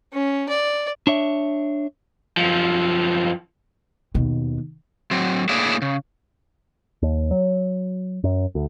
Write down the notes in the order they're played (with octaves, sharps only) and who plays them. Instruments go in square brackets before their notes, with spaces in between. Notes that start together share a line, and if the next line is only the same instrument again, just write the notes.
[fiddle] C#4
D5
[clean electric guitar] D4 C#5 E5
[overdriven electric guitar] F#2 F3
[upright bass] D#2 B2
[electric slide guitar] F#3 C4
A2 A#3 D4 E4 G#4 C#5
C#3
[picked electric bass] D#2
F#3
F#2
D2